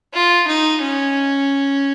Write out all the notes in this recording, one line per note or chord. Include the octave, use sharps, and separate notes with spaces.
F4
D#4
C#4